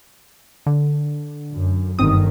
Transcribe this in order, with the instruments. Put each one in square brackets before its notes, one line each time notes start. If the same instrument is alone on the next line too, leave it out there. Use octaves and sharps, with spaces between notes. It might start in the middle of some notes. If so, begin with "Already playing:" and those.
[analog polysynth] D3
[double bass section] F#2
[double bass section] G1 D#3 [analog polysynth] C4 D#6